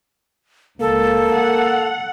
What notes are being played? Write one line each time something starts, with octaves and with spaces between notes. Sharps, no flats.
C#2 A#3 A4
F#5